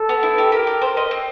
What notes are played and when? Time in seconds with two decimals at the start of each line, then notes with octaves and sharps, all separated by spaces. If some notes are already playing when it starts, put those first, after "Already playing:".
Already playing: A4
0.09 B3
0.23 E4
0.38 G4
0.52 G4 A#4
0.67 G4
0.82 A#4 C5
0.97 D#5
1.11 C4